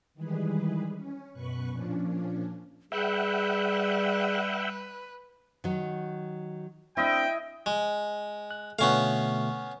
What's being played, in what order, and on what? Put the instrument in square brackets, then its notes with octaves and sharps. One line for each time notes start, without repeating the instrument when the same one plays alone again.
[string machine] D#3 E3 G3 G#3 G#4 B4
C#4
F#2 B2 B4 C#6 F#6
A#2 F3 C#4 D4
[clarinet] G3 [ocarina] G#4 [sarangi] B4 [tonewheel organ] E5 F#5 G5
[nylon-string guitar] D#3 F#3
[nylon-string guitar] C4 D4 [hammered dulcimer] E4 D#5 E5 [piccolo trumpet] G5
[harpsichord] G#3
[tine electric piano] F#6
[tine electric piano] B2 D3 A3 [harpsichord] B3 C#4 F5